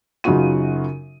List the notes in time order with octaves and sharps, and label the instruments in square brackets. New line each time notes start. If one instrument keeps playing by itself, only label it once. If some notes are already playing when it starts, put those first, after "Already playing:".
[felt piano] F#2 C#3 D#4 F4 F#4 D#7